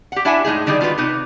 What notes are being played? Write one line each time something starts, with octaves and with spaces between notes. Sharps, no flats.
G4 F#5
D4 E4 E5 F#5 G#5
A2 G#3 D#4 G#4
D3 D#3 G3 D#4 G#4
D#3 F4 F#4 B4
C3 D#4 B4